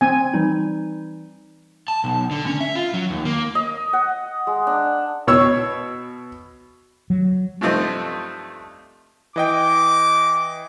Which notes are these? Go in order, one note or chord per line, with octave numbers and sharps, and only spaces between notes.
C4 G#5
E3 G3 D#4
A5
B1
D3
C#4
E5
F4
F#3
D#2
A#3
D#5
F#5
G#3
D4
B2 C#5 E6
F#3
G2 C3 F3 A3 C4 D#4
E3 D#5 G5 D6